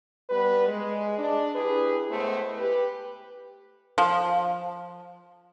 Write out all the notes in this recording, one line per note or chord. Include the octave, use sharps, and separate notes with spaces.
G3 B3 B4
G#3
D4
E4 G4 G#4 B4
A2 G#3 A3 B3 C5
G4 B4
F3